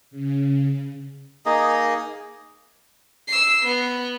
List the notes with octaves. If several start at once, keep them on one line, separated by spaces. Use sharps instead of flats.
C#3
A#3 D#4 G#4 D#5
E6 C7
B3